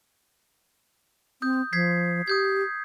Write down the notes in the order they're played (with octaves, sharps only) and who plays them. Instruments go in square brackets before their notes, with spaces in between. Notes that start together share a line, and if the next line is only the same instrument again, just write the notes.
[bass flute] C4 [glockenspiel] D#6 G6
[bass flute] F3 [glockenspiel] G#6 B6 C7
[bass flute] G4 [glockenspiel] D#6 G6 G#6